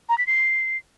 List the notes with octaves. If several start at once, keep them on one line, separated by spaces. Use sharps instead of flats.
A#5
B6
C7